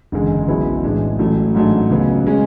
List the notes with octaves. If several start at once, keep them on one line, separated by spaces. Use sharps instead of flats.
F#1 E2 D3 G#3
B1 B2 G#3 B3 E4
A2 E3 G#3 D4
A1 A2 F#3 A3
A1 G#2 F#3 A3 D4
C#2 C#3 F#3 B3
C#3 G#3 C#4